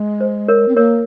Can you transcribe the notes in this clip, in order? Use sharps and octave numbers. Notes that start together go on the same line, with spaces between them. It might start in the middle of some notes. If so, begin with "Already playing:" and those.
Already playing: G#3
C5
A#4 C#5
C4
A#3 A#4 C#5